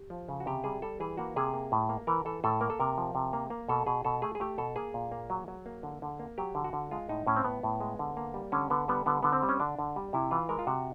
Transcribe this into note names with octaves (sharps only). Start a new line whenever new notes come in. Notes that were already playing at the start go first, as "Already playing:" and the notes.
Already playing: G4
F3
C#3
F#4
C3 G4
G3 G#4
G3 A4
E3 G#4
A#3 F#4
C3 G#4
A#3
A2
A#3
E3 A#4
E3 A4
A2 A4
A#3 A#4
A4
C3 A#4
F3
C3
A#3
A#3
B2 A4
B2 G#4
B2 A4
A3 G#4
G#4
A3 G4
B2 A4
A#3 G#4
A#2
A#3
F#3
F#3
A#3
D3
D3
A#3
F#3 G4
D3
F#4
D3
G#3 F4
A2 D#4
A2 C#4
C4
A2 B3
A2
G#3
D3
A#3
G3
D3 C#4
D3 B3
G3 B3
D3 B3
D3 B3
C4
G3
C#4
D3 D4
D3
G3
C3 E4
E3 F4
G#3 A#4
F4
C3 F#4